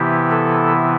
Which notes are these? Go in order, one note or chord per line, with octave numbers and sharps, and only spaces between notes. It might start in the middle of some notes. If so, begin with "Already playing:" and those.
Already playing: C3 E3 B3 E4 G4
A4